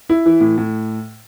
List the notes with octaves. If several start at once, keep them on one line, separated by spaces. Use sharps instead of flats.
E4
E3
A2
A2